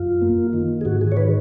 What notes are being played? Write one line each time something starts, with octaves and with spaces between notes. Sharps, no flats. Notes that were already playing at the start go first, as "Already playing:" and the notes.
Already playing: F#2 F4
A#3
D#3
G#4
G#2 F#4
G#4
C#5
D#3 B4